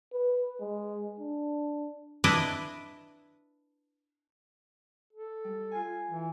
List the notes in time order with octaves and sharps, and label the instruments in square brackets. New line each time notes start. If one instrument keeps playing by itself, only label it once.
[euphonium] B4
G#3
D4
[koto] D4 E4 B4 D5 D#5
[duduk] A4
[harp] G3
F4 G#5
[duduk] E3